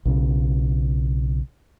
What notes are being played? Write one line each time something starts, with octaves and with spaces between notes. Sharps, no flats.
B1 C#3